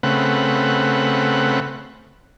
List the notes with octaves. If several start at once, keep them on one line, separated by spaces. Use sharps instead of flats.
C#3 A3 C4 B4 F#5